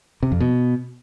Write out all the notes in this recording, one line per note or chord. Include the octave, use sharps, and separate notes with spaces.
C3
F2
B2